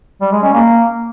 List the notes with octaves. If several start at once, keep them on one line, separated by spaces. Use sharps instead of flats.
G3
G#3
C#4
A#3